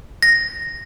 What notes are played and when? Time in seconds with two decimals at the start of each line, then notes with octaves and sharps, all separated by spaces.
0.23 A#6